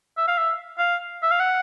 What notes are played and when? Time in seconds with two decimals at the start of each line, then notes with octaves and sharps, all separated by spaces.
0.17 E5
0.28 F5
0.38 E5
0.78 F5
1.23 E5
1.32 F5
1.40 F#5